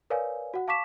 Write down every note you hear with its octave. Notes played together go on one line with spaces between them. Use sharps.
A#4 B4 C#5 D5 F5 G#5
F#4 F#5
F5 A5 C#6 D6 B6 E7